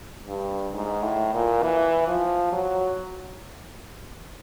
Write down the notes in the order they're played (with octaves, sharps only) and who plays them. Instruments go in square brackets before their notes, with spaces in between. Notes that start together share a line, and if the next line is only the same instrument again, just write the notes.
[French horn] G2
G#2
A2
A#2
E3
F3
F#3